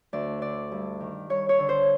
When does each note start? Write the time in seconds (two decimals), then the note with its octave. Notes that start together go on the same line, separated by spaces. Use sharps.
0.13 D2 D5
0.42 D3 D5
0.72 G2
1.00 D#3
1.30 G2 C#5
1.49 C#5
1.59 D3
1.69 C5